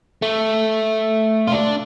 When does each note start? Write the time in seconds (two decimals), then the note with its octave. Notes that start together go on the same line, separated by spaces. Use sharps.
0.22 A3
1.47 F4
1.52 D4